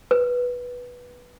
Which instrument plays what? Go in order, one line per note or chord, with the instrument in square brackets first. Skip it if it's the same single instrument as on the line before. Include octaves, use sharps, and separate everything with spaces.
[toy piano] B4